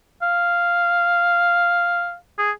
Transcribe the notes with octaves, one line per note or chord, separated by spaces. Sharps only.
F5
G#4